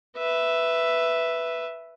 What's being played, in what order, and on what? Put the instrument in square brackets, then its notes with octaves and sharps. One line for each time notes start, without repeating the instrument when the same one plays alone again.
[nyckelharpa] B4 E5